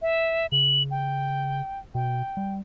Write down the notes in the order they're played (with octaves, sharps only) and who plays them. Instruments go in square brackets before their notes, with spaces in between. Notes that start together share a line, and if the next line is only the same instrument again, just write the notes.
[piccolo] E5
[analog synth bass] C#3 [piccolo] F#7
[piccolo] G5
[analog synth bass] B2 [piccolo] G5
[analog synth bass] G3